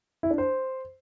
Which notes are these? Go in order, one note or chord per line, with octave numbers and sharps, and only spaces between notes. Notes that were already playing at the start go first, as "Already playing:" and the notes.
E4
D4
C5